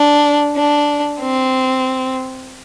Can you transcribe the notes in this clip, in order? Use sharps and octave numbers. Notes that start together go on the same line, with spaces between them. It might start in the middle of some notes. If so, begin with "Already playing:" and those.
Already playing: D4
D4
C4